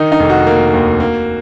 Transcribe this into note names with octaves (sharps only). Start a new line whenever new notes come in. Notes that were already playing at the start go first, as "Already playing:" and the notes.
Already playing: D#3 D#4
D#4
F1
F#4
A#3
D#2
A#3